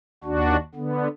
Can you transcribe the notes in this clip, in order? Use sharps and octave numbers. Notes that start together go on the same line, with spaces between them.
D#2 D4 F#4
D3 B3